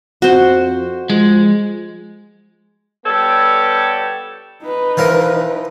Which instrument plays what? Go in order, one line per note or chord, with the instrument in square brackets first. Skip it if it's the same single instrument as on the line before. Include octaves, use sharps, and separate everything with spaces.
[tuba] F2 [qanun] F#4 C5
[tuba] F3 [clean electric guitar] G#3
[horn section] G3 B3 A4 C#5 D5 G5
[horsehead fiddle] D#4 B4
[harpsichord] E3 F3 A#4